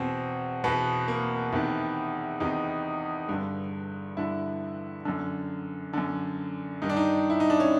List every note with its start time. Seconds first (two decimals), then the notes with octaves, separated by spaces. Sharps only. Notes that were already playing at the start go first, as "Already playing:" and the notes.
Already playing: E2 B2 C4
0.64 E2 B2 B3
1.08 A#3
1.52 E2 C3 D#3 B3
2.40 E2 C3 D#3 D#4
3.29 G2 D3
4.17 G2 D3 E4
5.05 F#2 D3
5.93 F#2 D3
6.82 G2 D#3 D#4
6.90 D4
6.97 D#4
7.30 E4
7.40 D#4
7.50 D4
7.60 C#4